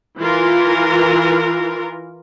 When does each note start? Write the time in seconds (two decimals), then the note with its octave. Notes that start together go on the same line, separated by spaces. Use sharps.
0.20 E3 F4 A#4